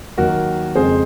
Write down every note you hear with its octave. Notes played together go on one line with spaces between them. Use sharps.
D#2 D#3 F#3 F#4 A#4
F2 C#3 G#3 G#4 C5